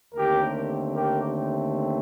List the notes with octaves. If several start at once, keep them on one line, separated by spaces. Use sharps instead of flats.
D#2 D3 A3 C4 G4 A#4
G4 A#4